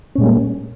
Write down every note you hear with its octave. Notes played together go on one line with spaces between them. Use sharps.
A#2 G3 G#3 A#3 C#4